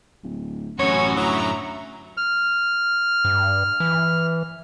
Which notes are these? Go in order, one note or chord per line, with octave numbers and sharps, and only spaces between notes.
D1
A1 F#2 A2 F#4 C#5 G#5
D2 F#3 E5 A#5
F6
G2
E3